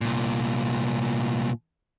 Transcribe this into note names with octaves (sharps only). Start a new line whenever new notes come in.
C2 A#2